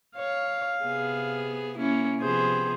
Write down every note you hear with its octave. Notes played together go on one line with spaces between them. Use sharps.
C#5 F5
C3 B3 G#4
A#3 C#4 E4
C3 F3 B3 G#4 C5